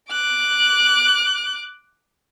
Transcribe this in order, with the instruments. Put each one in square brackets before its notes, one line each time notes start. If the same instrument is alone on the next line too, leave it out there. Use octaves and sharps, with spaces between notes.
[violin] D6 F#6